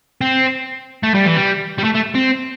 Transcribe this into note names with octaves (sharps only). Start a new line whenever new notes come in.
C4
A3
G3
E3
G3
G3
A3
A3
C4